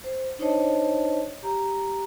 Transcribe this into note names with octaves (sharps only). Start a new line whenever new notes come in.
C5
D4 D#4 C5 C#5 D#5 A5
G4 A#5